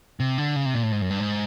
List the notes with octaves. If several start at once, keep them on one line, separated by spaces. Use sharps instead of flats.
C3
D3
C#3
C3
A#2
A2
G#2
F#2
G2
G#2